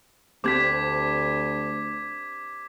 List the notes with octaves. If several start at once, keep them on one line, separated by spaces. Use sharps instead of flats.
D2 C4 D4 G4 D6 G#6 B6